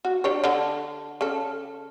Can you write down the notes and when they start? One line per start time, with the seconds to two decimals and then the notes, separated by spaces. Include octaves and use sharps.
0.05 F#4
0.24 D4 G4 C#5
0.44 D3
1.21 C#3 A4